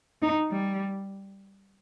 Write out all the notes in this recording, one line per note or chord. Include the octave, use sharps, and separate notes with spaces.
D#4
G3